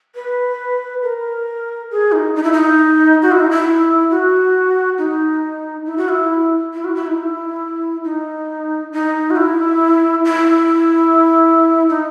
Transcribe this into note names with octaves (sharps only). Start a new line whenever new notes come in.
B4
A#4
G#4
D#4
D#4
E4
D#4
F#4
E4
D#4
E4
F#4
D#4
E4
F#4
E4
E4
F#4
E4
D#4
E4
D#4
D#4
F#4
E4
E4
D#4